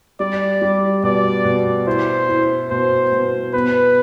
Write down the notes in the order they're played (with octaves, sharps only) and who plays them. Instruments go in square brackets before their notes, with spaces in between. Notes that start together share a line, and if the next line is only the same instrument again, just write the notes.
[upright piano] G3 [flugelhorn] D5
[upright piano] G3
[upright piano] B2 [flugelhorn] D5
[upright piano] B2
[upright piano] E4 [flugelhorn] C5
[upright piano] E4
[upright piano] B2 [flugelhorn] C5
[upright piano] B2
[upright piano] B3 [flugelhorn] B4